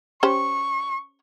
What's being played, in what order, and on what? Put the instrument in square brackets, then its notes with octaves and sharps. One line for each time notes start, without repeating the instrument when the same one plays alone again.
[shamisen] C#4 G4 C5 [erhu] C#6